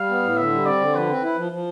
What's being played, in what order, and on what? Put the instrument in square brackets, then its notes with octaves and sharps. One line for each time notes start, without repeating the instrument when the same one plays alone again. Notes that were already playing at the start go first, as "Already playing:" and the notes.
Already playing: [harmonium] G3 [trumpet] F5
[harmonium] B3
A2
[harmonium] D3 [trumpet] E5
[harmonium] G3
[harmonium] C4 [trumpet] D5
[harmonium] D3
[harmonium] F3 [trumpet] B4
[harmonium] C4
E4
F3
F3